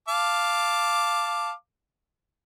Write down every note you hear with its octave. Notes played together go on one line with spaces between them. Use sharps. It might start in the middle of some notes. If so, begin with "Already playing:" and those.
F5 A5 D6